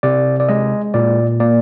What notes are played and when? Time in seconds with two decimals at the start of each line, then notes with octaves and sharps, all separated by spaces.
0.03 C3 D5
0.40 D5
0.49 G#3 D#5
0.94 A#2 D5
1.40 A#3 D5